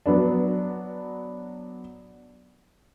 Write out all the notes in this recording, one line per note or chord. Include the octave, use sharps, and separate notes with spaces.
F#3 B3 D4